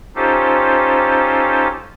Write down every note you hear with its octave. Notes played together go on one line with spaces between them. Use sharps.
C#4 D#4 F4 G4 A4 C5